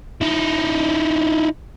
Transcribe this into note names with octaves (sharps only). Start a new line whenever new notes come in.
D#4 E4